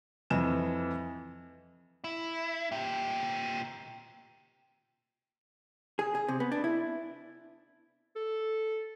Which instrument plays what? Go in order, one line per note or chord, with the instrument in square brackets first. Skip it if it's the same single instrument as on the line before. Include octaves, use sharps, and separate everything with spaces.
[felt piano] F2 E3 D#5 E7
[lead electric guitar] E4
A#2 G4
[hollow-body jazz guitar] G#4
G#4
C3
B3
D4
E4
[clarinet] A4